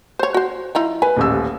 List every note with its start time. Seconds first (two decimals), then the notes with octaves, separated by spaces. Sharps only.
0.19 C5 C#5
0.34 F#4 C5
0.75 F3 D#4 E4
1.02 B4 G#5
1.16 D#1 A1 E6